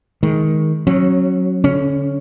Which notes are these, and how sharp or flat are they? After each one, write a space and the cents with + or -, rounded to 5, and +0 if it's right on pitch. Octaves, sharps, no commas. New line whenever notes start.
D#3 +15 G#3 +20
F#3 +0 C#4 -30
D3 -40 C#4 +0